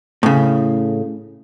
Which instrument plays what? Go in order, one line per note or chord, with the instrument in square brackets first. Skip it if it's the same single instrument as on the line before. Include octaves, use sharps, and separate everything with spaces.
[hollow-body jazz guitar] A2 C#3